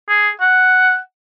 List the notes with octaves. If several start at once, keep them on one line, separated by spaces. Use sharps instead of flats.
G#4
F#5